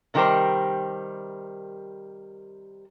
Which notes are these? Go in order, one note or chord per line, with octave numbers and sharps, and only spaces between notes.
C3 D#3 G3 G4 A#4 C5